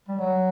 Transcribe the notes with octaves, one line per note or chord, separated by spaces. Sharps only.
G3
F#3